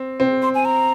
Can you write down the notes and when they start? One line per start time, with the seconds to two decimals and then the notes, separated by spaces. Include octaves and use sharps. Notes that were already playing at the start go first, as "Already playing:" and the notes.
Already playing: C4
0.20 C4
0.42 C6
0.55 G#5
0.65 A#5